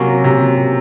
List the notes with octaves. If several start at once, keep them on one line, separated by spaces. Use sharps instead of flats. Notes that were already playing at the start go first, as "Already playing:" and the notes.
Already playing: C3 F#3 A#3 C#4
C3